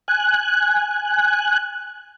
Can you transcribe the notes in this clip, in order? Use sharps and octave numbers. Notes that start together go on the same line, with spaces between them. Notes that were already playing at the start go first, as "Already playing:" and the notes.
G#5 F#6